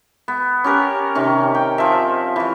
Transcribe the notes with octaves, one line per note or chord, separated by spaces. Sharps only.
B3
C#4 G4 A#4
C3 D#3 C#4
G5
F3 E5
E3 C#6